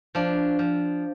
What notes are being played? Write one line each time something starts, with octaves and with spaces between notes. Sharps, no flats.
F3 D4
F3